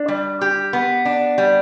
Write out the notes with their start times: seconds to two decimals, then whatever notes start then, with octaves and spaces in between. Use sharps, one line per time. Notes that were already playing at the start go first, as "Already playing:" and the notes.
Already playing: D4
0.08 G3
0.41 G4
0.73 B3
1.05 D4
1.38 G3